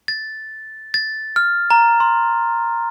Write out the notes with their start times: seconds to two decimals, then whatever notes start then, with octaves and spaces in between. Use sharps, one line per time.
0.08 A6
0.94 A6
1.36 F6
1.71 A#5
2.00 C6